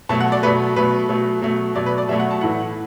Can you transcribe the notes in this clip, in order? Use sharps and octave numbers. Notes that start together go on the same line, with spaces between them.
B2 F#3 A3 A5
F#5
D5
B2 F#3 A3 B4
B2 F#3 A3 B4
B2 F#3 A3
B2 F#3 A3
B2 F#3 A3 D5
B4
D5
B2 F#3 A3 E5
F#5
A5
A2 E3 A3 F#5